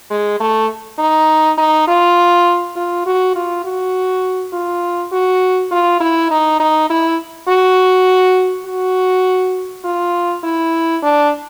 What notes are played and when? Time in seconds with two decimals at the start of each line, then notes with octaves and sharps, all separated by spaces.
0.11 G#3
0.40 A3
0.99 D#4
1.58 D#4
1.88 F4
2.76 F4
3.06 F#4
3.36 F4
3.65 F#4
4.53 F4
5.12 F#4
5.71 F4
6.00 E4
6.31 D#4
6.60 D#4
6.90 E4
7.48 F#4
8.66 F#4
9.85 F4
10.44 E4
11.03 D4